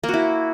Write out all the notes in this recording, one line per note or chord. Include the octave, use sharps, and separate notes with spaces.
A#3
F#4
E4